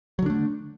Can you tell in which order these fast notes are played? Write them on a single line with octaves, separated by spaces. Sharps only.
F#3 D3 D4 A3